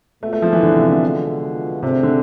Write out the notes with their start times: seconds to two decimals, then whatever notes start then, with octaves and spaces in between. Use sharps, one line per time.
0.21 B2 G#3 A3 B3 F4
0.33 A3
0.42 F3
0.53 E3
0.63 D3
0.75 C3
0.89 D3
1.82 C3 A3 D4 G#4 C5
2.03 D3